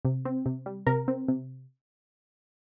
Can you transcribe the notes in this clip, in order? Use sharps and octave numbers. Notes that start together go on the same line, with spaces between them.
C3
C4
C3
G3
C3 A#4
C4
C3